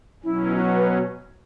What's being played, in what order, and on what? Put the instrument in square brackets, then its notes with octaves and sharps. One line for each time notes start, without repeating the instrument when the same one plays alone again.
[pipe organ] B2 F#3 C#4 [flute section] E4
[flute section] F#4
B4